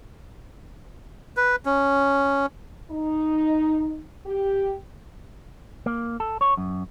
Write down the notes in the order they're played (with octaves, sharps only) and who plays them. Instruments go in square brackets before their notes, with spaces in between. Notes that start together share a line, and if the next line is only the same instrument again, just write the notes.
[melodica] B4
C#4
[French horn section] D#4
G4
[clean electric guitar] A#3
A4
C#5
F#2